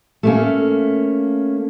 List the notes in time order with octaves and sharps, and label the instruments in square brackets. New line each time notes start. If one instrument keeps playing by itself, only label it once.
[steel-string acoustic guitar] A3 A#3 C#4